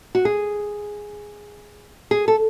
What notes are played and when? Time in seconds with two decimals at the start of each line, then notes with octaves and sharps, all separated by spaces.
0.15 F#4
0.25 G#4
2.11 G#4
2.28 A4